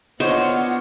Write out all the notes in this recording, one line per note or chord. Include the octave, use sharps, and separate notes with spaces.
B3 D4 F4 C5 C#5 D#5 F#5